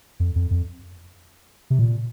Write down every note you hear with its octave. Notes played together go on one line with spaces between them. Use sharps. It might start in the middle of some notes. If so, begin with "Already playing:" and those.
F2
F2
F2
C3
A#2